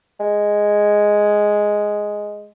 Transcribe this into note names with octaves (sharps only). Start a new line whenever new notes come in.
G#3